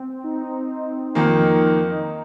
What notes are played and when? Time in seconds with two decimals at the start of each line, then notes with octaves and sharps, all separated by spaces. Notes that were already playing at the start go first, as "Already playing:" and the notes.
Already playing: C4
0.24 D#4
1.15 F2 D#3 A#3 D#4